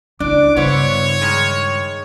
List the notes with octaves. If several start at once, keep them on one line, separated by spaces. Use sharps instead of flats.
C#2 D4 E4 D6
G2 C#3 B3 E4 C5 C#5
D#3 G#3